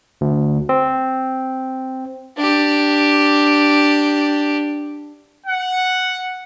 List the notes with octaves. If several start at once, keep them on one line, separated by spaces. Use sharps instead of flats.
D2
C4
D4 G4
F#5